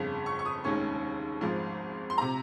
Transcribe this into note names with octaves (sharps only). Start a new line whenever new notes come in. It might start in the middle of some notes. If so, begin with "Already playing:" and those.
Already playing: G1 F2 C#3
C#6
C#6
D#6
F1 D#2 D#3 G#3 C#4 C#6
G#1 G#2 F3 G#3
C6
C3 A#5